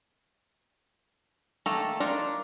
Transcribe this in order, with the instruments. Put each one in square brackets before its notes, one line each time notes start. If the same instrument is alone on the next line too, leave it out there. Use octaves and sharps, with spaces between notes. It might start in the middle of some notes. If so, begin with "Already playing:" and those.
[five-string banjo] D#3 A3 A#3 A4 A#5
D4 D#4 F4 A#4